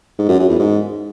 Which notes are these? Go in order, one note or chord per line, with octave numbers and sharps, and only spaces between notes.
G#2
F#2
F#2
E2
G#2